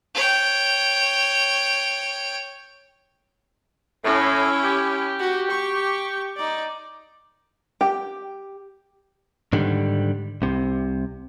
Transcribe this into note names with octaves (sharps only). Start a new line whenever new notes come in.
C#5 G5
A2 C#4 E4
G4
F#4
C#6
D#4 D5
G4
G#2 D3 D#3 G3
C2 C3